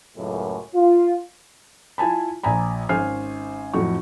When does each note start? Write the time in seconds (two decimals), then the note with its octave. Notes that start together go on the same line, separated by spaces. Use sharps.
0.17 C#2 F#2 A2
0.75 F4
1.98 E4 F4 G#5 A5 B5
2.43 A#1 D5 G#5 A#5 B5
2.89 G#1 C#4 C5 G#5 F6 C7
3.73 F2 A2 F#3 F#4 C#6